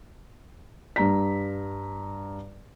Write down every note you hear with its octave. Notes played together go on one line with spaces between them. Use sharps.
G2 A#5 B6